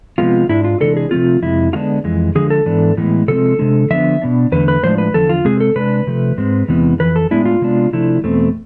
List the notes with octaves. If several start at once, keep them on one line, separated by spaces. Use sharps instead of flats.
C3 F3 G#3 B3 F4
G#2 G#3 D4 E4
F4
C3 E3 G#3 D4 A4
G#4
C3 F3 A3 C4 F4
F2 C3 G#3 E4
D3 G#3 B3 D4 F4
F2 E3 G#3
D3 F3 G#3 G#4
A4
G#2 E3 B3 D4
A2 E3 G#3 B3
C3 F3 G#3 C4 A4
C3 G#3 D4
D3 F3 B3 D4 E5
B2 B3 D4
E2 D3 A3 B4
B4
A2 F3 G#3 D4 C5
B4
E2 D3 F3 A4
F4
C3 G#3 C4 G#4
A4
C3 G#3 D4 B4
C3 F3 A3
G#2 G#3 C4
E2 C3 E3 G#3 B3
F2 E3 B4
A4
A2 G#3 B3 D4 E4
F4
C3 G#3 B3 D4
C3 F3 A3 D4 E4
E2 B2 A3 C4